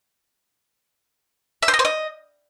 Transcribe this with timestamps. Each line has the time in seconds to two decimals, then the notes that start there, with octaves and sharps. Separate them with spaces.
1.63 E5
1.68 C5
1.74 D#5
1.79 C5
1.85 D#5